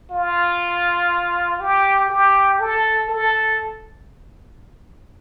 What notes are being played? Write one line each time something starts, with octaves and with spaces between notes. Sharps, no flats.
F4
G4
G4
A4
A4